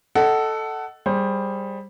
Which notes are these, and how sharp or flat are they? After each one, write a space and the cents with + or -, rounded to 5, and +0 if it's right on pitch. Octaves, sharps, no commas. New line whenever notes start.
A4 +0 D#5 +0 F#5 +20
G3 +5 G#4 +0 C5 +20